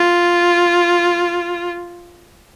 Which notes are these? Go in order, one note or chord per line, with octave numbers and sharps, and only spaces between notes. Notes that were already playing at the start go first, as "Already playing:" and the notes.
Already playing: F4